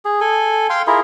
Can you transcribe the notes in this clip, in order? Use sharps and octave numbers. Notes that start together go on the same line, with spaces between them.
G#4
A4 G#5
F5 G5 C6
E4 F4 G#4 A#4